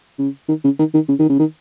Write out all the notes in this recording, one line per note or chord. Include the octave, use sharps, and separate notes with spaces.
C#3
D#3
C#3
D#3
D#3
C#3
D#3
C#3
D#3